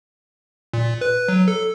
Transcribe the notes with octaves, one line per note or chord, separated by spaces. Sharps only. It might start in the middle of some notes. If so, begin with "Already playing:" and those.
A#2
B4
F#3
A4